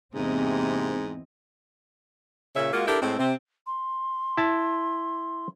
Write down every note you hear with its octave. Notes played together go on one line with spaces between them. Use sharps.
E2 G#2 C3 A#3 C4 E4 D#5
A#2 C#3 C#4 C#5 E5
G#3 A#3 F4 F#4
D4 E4 G4 A4 A#4
A2 G#3 C4
C3 C4
C6
E4 A5